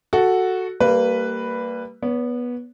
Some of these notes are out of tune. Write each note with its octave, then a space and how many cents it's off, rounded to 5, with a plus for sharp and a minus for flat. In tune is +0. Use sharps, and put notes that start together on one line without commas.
F#4 +0 A4 +0
G3 +0 A#3 -25 B4 +0
B3 -15 C#5 +30